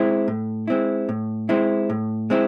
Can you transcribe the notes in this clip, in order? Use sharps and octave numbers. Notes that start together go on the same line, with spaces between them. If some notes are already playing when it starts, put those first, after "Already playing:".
Already playing: G#3 C4 E4
A2
G#3 C4 E4
A2
G#3 C4 E4
A2
G#3 C4 E4